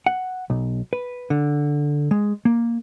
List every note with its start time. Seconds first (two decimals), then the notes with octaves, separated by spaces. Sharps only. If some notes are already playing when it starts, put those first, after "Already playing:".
0.06 F#5
0.50 B1
0.93 B4
1.30 D3
2.11 G#3
2.45 A#3